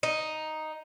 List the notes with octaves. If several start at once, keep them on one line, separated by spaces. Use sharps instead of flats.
D#4